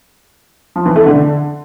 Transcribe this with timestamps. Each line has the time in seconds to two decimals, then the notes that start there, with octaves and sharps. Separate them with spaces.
0.76 F3
0.86 E3
0.96 A3
1.06 D3